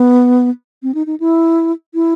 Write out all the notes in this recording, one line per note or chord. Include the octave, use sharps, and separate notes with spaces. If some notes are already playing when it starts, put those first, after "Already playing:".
Already playing: B3
C4
D#4
D#4
E4
E4